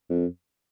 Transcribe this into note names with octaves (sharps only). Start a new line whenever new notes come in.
F2